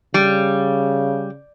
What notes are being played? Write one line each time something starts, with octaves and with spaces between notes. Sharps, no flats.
C#3 G3